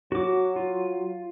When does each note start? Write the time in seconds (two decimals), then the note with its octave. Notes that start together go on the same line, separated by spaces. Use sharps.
0.12 F#3 F#4 D6
0.56 F4